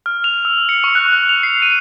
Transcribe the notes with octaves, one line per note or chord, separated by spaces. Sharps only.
F6
F7
E6
C#7
C#6
F#6
F#6
F7
C7
D#7